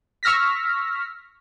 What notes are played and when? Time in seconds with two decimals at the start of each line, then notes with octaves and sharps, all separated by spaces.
0.23 C#6 E6 F6 A#6 B6